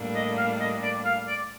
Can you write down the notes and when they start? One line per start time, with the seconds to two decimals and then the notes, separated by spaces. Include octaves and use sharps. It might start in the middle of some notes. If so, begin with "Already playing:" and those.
Already playing: A2 G3 A#3 D4
0.16 D#5
0.37 F5
0.60 D#5
0.83 D5
1.05 F5
1.27 D5